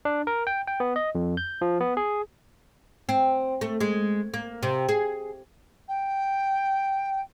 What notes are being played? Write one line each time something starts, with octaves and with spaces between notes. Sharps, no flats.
D4
A#4
G5
G5
B3
D#5
F2
G6
F3
B3
G#4
C4
A3
G#3
A#3
C3
G#4
G5